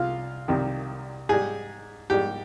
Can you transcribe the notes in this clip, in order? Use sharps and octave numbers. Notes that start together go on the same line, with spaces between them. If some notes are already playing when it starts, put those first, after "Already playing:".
Already playing: C2 F4
C2 C3 D#3
G#2 G3 G#4
G#2 G3 G4